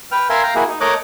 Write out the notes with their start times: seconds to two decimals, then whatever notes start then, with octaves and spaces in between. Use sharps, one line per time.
0.12 B4 G5 F6
0.30 A#4 E5 F5 G#5 C6
0.43 F5 G5 A#5
0.55 A#3 E4 F#4 G#4
0.69 D#4
0.81 A3 A#4 C#5 D#5 D6 F#6